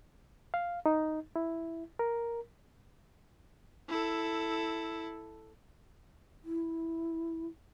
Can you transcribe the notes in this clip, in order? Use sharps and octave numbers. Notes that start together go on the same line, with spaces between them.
F5
D#4
E4
A#4
E4 A4
E4